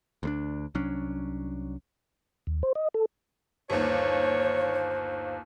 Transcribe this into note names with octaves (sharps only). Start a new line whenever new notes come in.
D2 G#3 D4
C2 F#3 C#4 D4
D#2
C5
D#5
A4
G1 D#2 C5 C#5